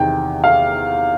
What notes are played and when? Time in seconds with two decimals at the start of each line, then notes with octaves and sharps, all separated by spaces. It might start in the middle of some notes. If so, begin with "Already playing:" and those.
Already playing: E2 C3 D#3 G5
0.44 F5